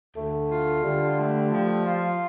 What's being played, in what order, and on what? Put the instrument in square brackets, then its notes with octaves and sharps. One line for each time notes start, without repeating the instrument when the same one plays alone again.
[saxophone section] D2 [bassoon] A3
[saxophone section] F4
[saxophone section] D3 [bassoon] G3
[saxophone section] A3
F3
F4